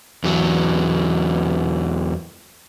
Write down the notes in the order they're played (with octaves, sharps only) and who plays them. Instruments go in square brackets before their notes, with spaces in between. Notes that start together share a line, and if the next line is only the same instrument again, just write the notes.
[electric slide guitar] E2 F#3